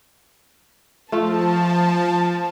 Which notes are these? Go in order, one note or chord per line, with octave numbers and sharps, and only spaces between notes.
F3 A3 F4 A5